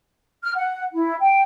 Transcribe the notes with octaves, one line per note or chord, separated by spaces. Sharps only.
F6
F#5
E4
G5